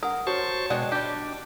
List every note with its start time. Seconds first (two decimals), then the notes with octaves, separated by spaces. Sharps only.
0.03 A#4 F#5 D#6
0.27 F#4 C5 C#5 A5 C#6
0.70 B2 G#3 D4 D5 D#5 F#5 G5
0.92 G3 D4 G4